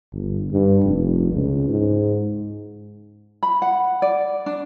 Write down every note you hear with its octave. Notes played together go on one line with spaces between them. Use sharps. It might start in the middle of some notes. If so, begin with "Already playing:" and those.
G1
G2
F1
C#2
G#2
B5
F#5
D5
D4